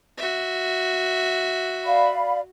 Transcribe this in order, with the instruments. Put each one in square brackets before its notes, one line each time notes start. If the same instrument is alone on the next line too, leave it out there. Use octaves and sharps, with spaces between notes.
[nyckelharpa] F#4 E5
[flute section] D5 F5 B5